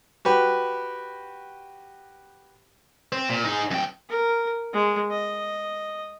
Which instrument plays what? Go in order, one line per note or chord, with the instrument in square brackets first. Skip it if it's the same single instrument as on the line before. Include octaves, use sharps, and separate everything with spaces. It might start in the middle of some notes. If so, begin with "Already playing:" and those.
[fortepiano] F#4 G4 B4
[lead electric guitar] C4
A#2
D#4 G#4
F#2 G5
[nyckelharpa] A#4
G#3
D#5